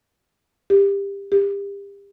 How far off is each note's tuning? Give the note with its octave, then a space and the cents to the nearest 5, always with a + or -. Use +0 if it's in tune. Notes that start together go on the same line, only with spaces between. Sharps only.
G4 +20
G4 +30